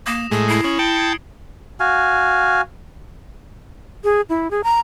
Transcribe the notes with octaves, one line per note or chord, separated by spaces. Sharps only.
A#3 D#6 A#6 E7
A2 G#3 G#4
E4 C7
C#4 D#6 F#7
G5 A5 C#7 D7 G7
G#6 C#7
F#4 F5 G#5
G#4
E4
G#4
A#5